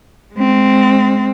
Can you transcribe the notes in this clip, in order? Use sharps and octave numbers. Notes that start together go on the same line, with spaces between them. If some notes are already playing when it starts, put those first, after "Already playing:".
G#3 C4